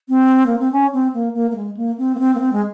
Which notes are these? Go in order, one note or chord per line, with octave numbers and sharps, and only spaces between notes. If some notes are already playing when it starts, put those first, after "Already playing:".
C4
A#3
C4
C#4
C4
A#3
A#3
A#3
G#3
A#3
C4
A#3
C4
A#3
C4
G#3